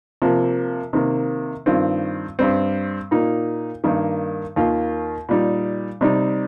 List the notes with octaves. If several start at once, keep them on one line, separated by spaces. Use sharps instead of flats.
C3 F3 A#3
C3 D#3 A#3
G2 D#3 C4 F4
G2 G3 C4
A#2 A#3 D#4
G2 D#3 A#3 D#4
D#2 D#3 A#3 F4
A#2 G3 D#4
C3 G3 D#4